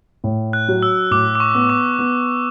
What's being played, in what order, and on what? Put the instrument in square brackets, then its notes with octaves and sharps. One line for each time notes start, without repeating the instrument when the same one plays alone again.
[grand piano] A2
[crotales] F#6
[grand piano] F#3
[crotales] E6
[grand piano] A2 [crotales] D6
[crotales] D6
C#6
[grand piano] B3
[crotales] D6
[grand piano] B3